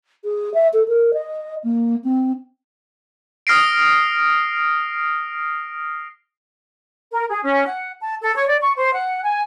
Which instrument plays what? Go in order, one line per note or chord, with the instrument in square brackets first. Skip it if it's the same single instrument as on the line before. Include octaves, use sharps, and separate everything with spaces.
[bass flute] G#4
E5
A4
A#4
D#5
A#3
C4
[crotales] D#6 F6 A#6 C7 D7
[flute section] A#4
G#4
C#4
F#5
A5
A4
C#5
D5
C#6
C5
F#5
G#5